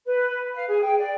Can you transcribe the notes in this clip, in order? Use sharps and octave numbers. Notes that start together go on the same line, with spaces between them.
B4
F5
G#4
G5
D5